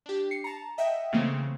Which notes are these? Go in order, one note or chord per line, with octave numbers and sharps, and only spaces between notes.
D4 G4
C7 C#7
A5 A#5
D#5 E5 F#5 G5
C#3 E3 A3 A#3 C4